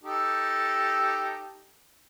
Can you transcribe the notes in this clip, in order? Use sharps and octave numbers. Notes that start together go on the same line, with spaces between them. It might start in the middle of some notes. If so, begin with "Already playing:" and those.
D#4 G4 A4